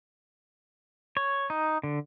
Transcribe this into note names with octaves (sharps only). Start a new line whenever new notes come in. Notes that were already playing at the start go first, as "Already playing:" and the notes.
C#5
D#4
D3